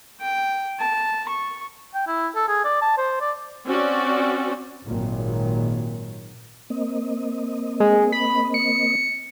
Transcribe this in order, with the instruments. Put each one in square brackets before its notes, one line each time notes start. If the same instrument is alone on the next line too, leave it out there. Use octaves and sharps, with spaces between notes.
[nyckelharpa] G5
A5
C#6
[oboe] G5
E4
A4
G#4
D5
A5
C5
D5
[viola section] C4 C#4 F#4 D5
[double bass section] G#1 A#2 D#3 F#3
[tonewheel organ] A#3 C4 D#5
[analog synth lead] G#3
B5
C#7